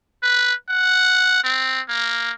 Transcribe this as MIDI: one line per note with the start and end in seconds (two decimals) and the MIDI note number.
0.22 0.54 71
0.69 1.39 78
1.44 1.81 60
1.88 2.31 58